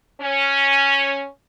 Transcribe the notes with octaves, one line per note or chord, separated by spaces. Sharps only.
C#4